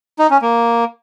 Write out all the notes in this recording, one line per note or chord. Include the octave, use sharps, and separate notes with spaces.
D#4
C#4
A#3